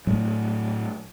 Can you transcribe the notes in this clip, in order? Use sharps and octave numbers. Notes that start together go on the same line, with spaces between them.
A2 F#3 A3